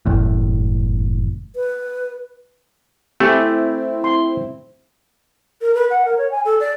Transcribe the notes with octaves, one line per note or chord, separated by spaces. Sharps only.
F#1 E2 A2
B4
A3 C4 E4 G4 G#5
C6
A#4
B4
F#5
A#4
C#5
G#5
A4
D5